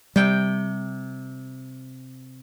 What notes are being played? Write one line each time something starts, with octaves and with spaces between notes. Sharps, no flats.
C3 G3 G5